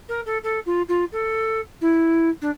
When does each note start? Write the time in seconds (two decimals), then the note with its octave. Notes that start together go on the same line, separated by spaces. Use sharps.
0.09 A#4
0.26 A4
0.43 A4
0.66 F4
0.88 F4
1.12 A4
1.81 E4
2.41 D4